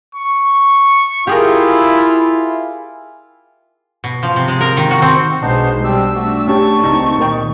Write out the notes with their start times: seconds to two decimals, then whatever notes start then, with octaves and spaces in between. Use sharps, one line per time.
0.15 C#6
1.27 E4 F4 G4 G#4 A#4
4.04 B2
4.23 F3
4.36 C3
4.48 G#3
4.61 A#4
4.77 D#3
4.91 F#4
5.02 C4
5.42 B1 G#3 B3 D4 D#4 C5
5.83 G3 C4 D4 G4 E6
6.15 A3 D4 F#4
6.47 C#4 G4 A5 C#6
6.84 C#2 C4 D#4
7.20 A#2 D#3 A#4 D#5 G5